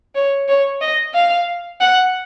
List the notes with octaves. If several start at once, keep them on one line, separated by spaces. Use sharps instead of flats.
C#5
C#5
D#5
F5
F#5